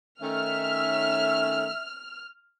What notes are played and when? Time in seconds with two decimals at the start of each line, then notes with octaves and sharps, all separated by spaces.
0.22 D#3 A3 C#4 E5 F6